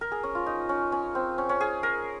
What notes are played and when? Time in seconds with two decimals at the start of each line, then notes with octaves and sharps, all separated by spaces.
0.01 A#4
0.12 G#4
0.23 C#4
0.35 F4
0.46 D#4
0.69 C#4
0.92 C#4
1.15 C4
1.38 C#4
1.49 C#4
1.61 G#4
1.83 A#4